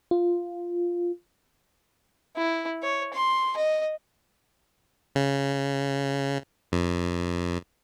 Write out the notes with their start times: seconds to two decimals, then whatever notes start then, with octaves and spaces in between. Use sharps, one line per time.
0.11 F4
2.36 E4
2.83 C#5
3.13 C6
3.57 D#5
5.15 C#3
6.72 F2